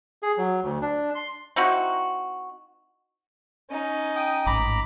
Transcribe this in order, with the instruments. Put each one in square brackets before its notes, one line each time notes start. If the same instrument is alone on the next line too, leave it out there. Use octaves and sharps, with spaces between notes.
[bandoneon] G#4
F#3
D2
D4
C6
[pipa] C4 D#4 E4 F#4
[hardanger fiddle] C#4 D#4
[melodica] G5 D#6
[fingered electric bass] A1 G#2 [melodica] A#5 B5 D6